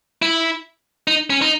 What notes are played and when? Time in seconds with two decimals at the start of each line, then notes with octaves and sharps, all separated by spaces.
0.22 E4
1.08 D#4
1.30 C#4
1.42 D#4